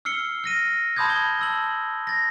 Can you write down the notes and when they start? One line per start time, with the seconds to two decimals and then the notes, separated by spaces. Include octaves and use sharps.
0.05 E6 F6 C7 C#7 G7
0.44 F6 A#6 D#7
0.96 A5 B5 C6 D#6 G6 G#6
1.10 G7
1.39 A5 E6 F#7
2.07 A6 A#6